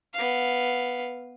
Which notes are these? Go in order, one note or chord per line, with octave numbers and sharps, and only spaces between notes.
B3 F5